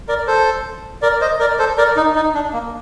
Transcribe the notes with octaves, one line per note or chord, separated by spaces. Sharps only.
A#4 D5
A4 C5
A#4 D5
C5 D#5
A#4 D5
A4 C5
A#4 D5
D#4
D#4
D4
A#3